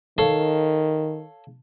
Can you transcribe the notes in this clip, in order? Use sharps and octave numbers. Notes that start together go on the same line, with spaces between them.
D#3 A4 C#5 F5